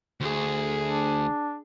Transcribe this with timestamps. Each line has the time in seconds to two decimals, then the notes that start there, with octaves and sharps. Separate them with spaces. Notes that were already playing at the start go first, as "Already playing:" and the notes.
0.20 D2 G#4
0.85 D4